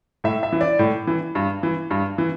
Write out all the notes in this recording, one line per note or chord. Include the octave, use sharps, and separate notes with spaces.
A2 E5
E5
E3
D5
A2
E3
G2
E3
G2
E3